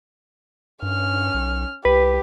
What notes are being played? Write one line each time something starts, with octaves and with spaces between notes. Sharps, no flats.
G2 C#4 F6
B1
C2 G4 B4